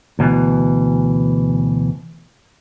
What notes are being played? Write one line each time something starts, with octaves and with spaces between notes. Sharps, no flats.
D2 B2 D#3 E3